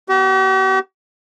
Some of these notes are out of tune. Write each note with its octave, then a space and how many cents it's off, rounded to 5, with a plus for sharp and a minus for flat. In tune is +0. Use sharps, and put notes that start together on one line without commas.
B3 -30 G4 -45